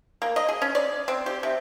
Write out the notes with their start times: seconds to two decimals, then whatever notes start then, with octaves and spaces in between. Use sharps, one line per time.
0.22 A#3
0.36 D#5
0.49 G#4
0.62 C#4
0.75 D5
1.08 C4
1.26 G4
1.43 C3